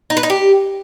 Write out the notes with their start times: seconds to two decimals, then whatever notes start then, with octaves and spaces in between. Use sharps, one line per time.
0.10 D#4
0.17 B4
0.23 D#4
0.30 G4